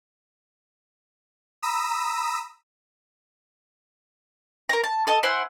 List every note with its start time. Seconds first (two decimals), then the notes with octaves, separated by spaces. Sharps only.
1.62 A#5 B5 D#6 E6
4.69 A#4 A#5
4.84 A5
5.07 A4 D#5 A5
5.23 E4 C5 F#5 G#5